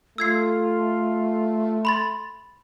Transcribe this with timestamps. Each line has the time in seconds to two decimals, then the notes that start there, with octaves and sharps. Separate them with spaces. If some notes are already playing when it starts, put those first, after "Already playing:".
0.18 A3 F4 E6 G#6 C7
1.85 B5 C6 A6